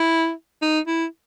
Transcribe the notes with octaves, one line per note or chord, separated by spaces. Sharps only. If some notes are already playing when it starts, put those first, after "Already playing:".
Already playing: E4
D#4
E4